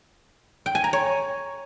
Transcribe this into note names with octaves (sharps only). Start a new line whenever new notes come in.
G5
G#5
A#5
C#5